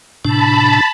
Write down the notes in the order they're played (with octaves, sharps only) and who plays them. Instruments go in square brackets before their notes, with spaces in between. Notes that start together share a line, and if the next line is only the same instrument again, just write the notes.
[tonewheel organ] A2 C3 D4 [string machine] A5 B5